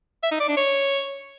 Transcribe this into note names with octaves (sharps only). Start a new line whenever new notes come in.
E5
D#4
D5
D4
C#5